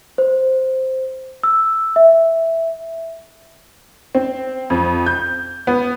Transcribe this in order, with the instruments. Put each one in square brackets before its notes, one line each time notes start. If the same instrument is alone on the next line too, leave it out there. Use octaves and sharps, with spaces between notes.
[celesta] C5
E6
E5
[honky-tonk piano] C4
F2
G6
B3